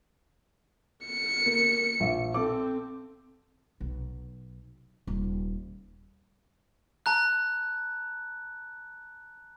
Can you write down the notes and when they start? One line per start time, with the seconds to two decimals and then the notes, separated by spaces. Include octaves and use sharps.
1.06 C#7
1.46 A#3
2.00 A#1 E5
2.34 C4 A4 D6
3.81 B1
5.07 D#1
7.06 A5 A#5 F#6